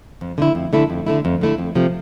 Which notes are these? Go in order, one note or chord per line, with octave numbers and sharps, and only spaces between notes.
F2
D3 A3 E4
F2
D3 A3 E4
F2
D3 A3 E4
F2
D3 A3 E4
F2
C3 F3 A3